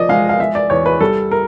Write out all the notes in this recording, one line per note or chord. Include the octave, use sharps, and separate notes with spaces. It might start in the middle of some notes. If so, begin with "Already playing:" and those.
Already playing: F3 D5 D#5
G#3 F5
F5
G#3 E5
D5
E2 C#5
B4
G3 A4
A#4